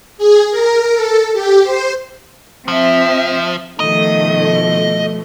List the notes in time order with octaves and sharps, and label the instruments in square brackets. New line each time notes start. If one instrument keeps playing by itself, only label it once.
[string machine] G#4
A#4
A4
G4
C5
[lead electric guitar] F3 [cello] C4 E5
[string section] B2 F3 A3 [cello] D#3 [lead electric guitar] D#5